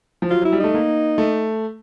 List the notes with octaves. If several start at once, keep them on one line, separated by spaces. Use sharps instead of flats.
F3
F#3 F4
F#3 E4
G3
A3 D#4
A#3
A3